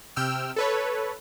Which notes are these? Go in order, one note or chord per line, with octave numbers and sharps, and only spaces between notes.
C3 G5 E6 F6
A4 B4 C#5